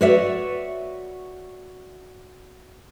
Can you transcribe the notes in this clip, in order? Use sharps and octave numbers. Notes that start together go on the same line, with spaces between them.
F#4 B4 C#5 D5 E5